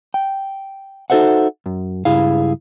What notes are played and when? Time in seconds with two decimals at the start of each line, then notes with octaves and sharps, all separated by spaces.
0.14 G5
1.10 D#4 F#4 A4 C5 E5 F#5
1.66 F#2
2.05 C#2 G2 E4 G#4 F5